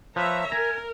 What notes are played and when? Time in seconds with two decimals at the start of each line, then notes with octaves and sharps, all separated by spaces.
0.16 F3 B4 C#5 E5 A#5
0.52 A#4 G#5 A#5